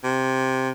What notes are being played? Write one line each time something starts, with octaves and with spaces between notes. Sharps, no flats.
C3